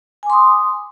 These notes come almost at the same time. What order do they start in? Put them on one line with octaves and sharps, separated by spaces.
G#5 D6 C6 D#6